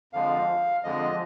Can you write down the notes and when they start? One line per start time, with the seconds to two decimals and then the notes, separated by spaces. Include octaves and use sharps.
0.13 F2 D3 F3 G#3 F5
0.84 F2 D3 F3 G#3 D#5